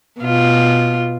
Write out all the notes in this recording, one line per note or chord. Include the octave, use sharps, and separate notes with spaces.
B2 F4